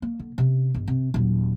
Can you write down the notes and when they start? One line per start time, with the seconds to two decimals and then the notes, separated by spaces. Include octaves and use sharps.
0.02 A#3
0.20 D3
0.38 C3 C#4
0.74 G1 D#3
0.88 C3
1.14 D#1 F#3